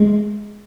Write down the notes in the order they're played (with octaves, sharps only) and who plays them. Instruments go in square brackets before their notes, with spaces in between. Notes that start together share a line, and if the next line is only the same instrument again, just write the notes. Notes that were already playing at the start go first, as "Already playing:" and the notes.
Already playing: [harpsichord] G#3